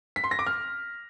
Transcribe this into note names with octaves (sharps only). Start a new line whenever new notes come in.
B6
C6
A#6
D6
F6